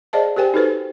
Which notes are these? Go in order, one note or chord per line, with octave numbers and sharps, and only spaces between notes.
G#4 C5 D5 D#5 F5 A5
G4 A#4 C5 G5 G#5
D#4 F#4 A4 B4 C5